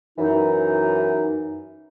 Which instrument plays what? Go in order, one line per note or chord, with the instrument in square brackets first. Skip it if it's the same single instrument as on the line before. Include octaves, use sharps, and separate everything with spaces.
[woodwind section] F#2 E3 D#4